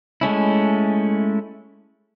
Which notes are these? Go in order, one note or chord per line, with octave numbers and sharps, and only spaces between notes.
G#3 A3 C#4 E4